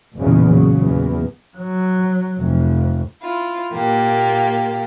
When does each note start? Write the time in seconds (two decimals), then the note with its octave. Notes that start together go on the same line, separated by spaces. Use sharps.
0.15 F#1 B1 E2 A#2 C#3 E3
0.48 C#3 F#3
0.82 E2 A#2
1.57 F#3
2.40 F1 F2
3.22 E4 F4
3.72 A#2 A#3 G4